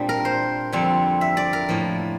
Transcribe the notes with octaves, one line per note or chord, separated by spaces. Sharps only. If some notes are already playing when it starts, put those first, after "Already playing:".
Already playing: A#2 G3 A#3 C4 D4
A#4
C5
F2 D3 G3 C4
E5
D5
A#4
A2 F3 A#3